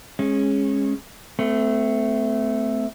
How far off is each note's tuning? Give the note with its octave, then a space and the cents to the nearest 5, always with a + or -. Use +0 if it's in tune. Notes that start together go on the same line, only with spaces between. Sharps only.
G#3 +0 C#4 -20
A3 +0 C4 -35